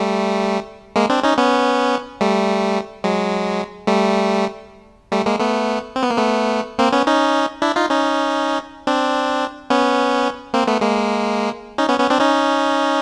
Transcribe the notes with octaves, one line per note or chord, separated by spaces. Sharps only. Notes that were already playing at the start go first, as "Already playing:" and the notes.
Already playing: G3 A3
G#3 A#3
C4 D4
C#4 D#4
B3 C#4
G3 A3
F#3 G#3
G3 A3
G3 A3
G#3 A#3
A3 B3
C4
B3
A#3
A3 B3
A#3 C4
B3 C#4
C#4 D#4
D4 E4
D#4 F4
C#4 D#4
C4 D4
B3 C#4
A#3 C4
A3 B3
G#3 A#3
C#4 D#4
B3 C#4
B3 C#4
C4 D4
C#4 D#4